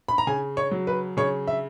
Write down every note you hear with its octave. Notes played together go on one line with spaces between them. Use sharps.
B5
A#5
C#3 G#5
C#5
F#3
B4
C#3 C#5
E5